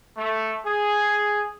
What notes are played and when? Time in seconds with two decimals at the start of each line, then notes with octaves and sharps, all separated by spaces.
0.18 A3
0.66 G#4